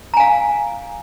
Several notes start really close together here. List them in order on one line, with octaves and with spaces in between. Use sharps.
A#5 G#5 F5